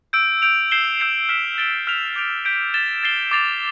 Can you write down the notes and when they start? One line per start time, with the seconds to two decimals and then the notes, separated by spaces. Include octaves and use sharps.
0.13 E6 G6 D7
0.42 G6 D7 F7
0.71 G6 C7 E7 G7
1.00 E6 G6 C7 F7
1.29 F6 B6 E7 G7
1.58 A6 D7 G7
1.87 F6 B6 F7
2.16 D6 G6 D7 F7
2.45 G6 B6 D7
2.74 A6 E7 G7
3.03 A6 C7 E7 G7
3.31 D6 A6 C7 F7